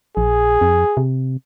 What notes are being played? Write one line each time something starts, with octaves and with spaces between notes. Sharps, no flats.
A#1 G#4
F2
C3